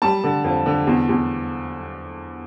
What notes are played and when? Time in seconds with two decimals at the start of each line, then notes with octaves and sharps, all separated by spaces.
0.02 G3 A5
0.24 D3
0.44 F2
0.66 D3
0.87 E2
1.09 E2